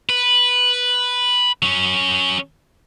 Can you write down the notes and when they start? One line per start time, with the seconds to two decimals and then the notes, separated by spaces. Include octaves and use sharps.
0.09 B4
1.63 F#3 C#4